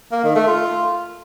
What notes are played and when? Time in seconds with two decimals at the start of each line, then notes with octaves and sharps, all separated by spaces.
0.12 A#3
0.24 D#3
0.35 A3
0.47 F4